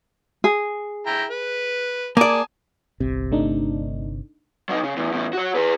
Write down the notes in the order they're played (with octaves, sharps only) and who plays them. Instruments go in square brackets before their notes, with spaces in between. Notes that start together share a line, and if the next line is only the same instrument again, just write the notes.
[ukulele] G#4
[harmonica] E4 G5 A#5
B4
[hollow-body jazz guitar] A#3 D5 [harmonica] G#5 A5 D#6
[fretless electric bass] G1 C3 [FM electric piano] C2
[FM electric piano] A3 D4 D#4
[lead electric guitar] F#3 D#4
C#3
E2 A2
E2 A2
F#4 C#5
G#4 B4